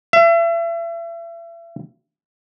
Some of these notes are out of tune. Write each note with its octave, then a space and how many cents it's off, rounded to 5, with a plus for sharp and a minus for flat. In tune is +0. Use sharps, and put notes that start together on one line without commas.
E5 +35